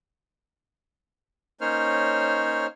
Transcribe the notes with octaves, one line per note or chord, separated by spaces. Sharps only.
A#3 C#4 D#4 C5 C#5 F6